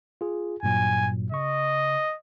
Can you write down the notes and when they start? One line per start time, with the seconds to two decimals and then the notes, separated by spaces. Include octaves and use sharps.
0.21 F4 G#4
0.63 G2 A#2 F#3 G#5
1.32 C#3 D#5 C#6